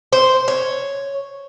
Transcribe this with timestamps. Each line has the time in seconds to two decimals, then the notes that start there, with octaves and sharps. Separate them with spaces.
0.12 C5
0.48 C#5